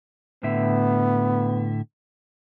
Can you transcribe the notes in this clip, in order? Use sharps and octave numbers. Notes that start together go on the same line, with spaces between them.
A2 D3 B3 E5